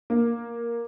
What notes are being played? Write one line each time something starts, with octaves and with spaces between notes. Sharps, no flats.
A#3